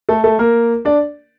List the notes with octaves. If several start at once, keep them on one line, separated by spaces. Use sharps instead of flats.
A3 A4
A3 A4
A#3 A#4
D4 D5